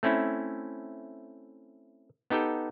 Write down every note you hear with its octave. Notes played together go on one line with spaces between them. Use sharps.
A3 C4 C#4 E4
B3 D#4 G4 A4 G5